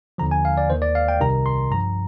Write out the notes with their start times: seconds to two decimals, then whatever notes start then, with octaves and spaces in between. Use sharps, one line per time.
0.18 D#2 D3 F3 A#5
0.31 G#5
0.45 F5
0.57 D5
0.70 D#2 D#3 C5
0.82 D5
0.95 F5
1.08 G5
1.21 C2 C3 D#3 A#5
1.46 C6
1.71 G2 F3 A#5